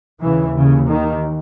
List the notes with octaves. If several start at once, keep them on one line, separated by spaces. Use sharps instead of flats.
D#2 C#3 E3
C#3
D#3